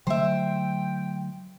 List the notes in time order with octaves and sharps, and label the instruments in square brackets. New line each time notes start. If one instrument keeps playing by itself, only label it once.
[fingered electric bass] D3 F#3 A3 [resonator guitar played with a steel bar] C5 E5 [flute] G5